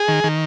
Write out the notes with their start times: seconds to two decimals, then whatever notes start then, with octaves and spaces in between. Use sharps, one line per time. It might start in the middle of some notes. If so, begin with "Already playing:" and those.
Already playing: G#4
0.08 D#3
0.24 D#3